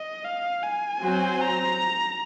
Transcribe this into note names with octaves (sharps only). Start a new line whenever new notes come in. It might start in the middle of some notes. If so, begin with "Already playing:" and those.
Already playing: D#5
F5
G#5
F#3 C4 F#4 C5
A#5